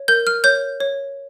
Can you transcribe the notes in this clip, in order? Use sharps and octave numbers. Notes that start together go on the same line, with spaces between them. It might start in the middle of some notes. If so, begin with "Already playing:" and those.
Already playing: C#5
A#4 G6
F6
C#5 G6
C#5